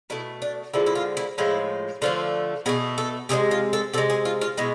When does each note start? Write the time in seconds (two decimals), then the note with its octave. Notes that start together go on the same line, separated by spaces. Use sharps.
0.10 B2 A3 E4
0.42 D4
0.74 D3 F3 G#3 E4
0.86 E4
0.95 F4
1.17 E4
1.38 A2 F3 G#3 E4
2.02 D3 F3 A3 F4
2.66 B2 A3 G#4
2.98 A4
3.29 C3 E3 G#3 G#4
3.51 F4
3.73 A4
3.94 C3 A4
3.98 G#3
4.10 G#4
4.25 F4
4.41 F4
4.57 B2 G#3 E4